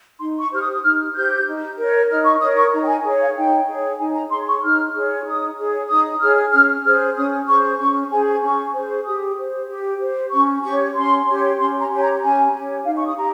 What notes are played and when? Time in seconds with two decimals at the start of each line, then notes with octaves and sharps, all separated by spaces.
0.19 D#4 C6
0.41 C#6
0.51 G4 C5 F6
0.61 D#6
0.73 D#6
0.82 D#4 F6
1.14 G4 C5 G6
1.46 D#4
1.77 A#4 C#5
2.09 D#4 F6
2.24 C#6
2.40 A#4 C#5 D#6
2.57 C#6
2.72 D#4 A#5
2.83 G5
2.88 G#5
3.04 G#4 C#5
3.20 F5
3.36 D#4 G5
3.67 G#4 C#5
3.99 D#4 G#5
4.14 A#5
4.30 G#4 C#5 C6
4.47 C#6
4.62 D#4 F6
4.94 G#4 C#5
5.25 D#4 D#6
5.57 G#4 C#5
5.89 D#4 D#6
6.20 G#4 C#5 F6
6.52 C#4 F6
6.84 G#4 C5 F6
7.15 C#4 D#6
7.47 G#4 C5 C#6
7.79 C#4 C#6
8.10 G#4 C5 G#5
8.42 C#4 C#6
8.74 G#4 C5
9.05 G4 D#6
9.37 C5
9.68 G4
10.00 C5
10.32 C#4 C#6
10.63 G4 C#6
10.68 C#5
10.95 C#4 C6
11.26 G4 C#5
11.58 C#4 C6
11.79 A#5
11.90 G4 C#5 G#5
12.01 A#5
12.22 C#4 G#5
12.54 G4 C#5
12.85 D#4 F5
12.97 C#6
13.06 D#6
13.16 G4 A#5